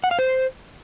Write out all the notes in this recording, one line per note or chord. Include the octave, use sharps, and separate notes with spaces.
F#5
F5
C5